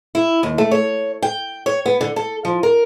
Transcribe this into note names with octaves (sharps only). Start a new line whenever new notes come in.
E4
D#2
A3
C#5
G5
C#5
B3
D3
A4
F3
A#4